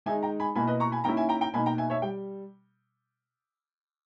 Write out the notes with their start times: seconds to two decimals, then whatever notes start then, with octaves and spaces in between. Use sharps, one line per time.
0.06 D#3 G#3 D#4 E5 G#5
0.23 G5 A#5
0.40 G#5 B5
0.55 B2 A#3 E4 G#5 B5
0.67 B4 D#5
0.80 A#5 C#6
0.92 G#5 B5
1.04 D#3 A#3 C#4 E4 G5 A#5
1.17 E5 G#5
1.29 G5 A#5
1.41 G5 A#5
1.53 B2 A#3 D#4 G#5 B5
1.66 G5 A#5
1.78 E5 G#5
1.90 C#5 E5
2.02 G3 G5